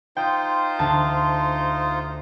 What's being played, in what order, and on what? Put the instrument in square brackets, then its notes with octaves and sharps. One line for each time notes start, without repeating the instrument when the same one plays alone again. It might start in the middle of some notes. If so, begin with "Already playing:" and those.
[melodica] D#4 F4 C5 [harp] G5
[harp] D2 A5